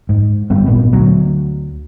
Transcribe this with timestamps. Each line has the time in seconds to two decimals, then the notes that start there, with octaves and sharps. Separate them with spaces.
0.09 G#2
0.50 G1 G3 B3
0.66 G#1 A#2 B3
0.93 D2 F#3